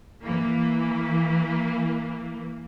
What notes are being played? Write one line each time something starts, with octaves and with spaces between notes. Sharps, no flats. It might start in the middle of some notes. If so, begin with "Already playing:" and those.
E3 A#3